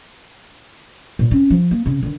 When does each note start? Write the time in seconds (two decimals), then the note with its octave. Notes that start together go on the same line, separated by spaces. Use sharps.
1.19 A#2
1.31 C4 C#4
1.50 F3
1.71 A#3
1.86 C#3 C4
2.03 D3 D#3